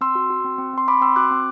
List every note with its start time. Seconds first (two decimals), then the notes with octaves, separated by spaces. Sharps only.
0.01 C4 C6 E6
0.15 F#4
0.30 F#4
0.44 C4
0.58 C4
0.73 C4 C6
0.88 C4 B5 D6
1.01 C4 C6 E6
1.16 F#4 D6 F#6
1.31 C4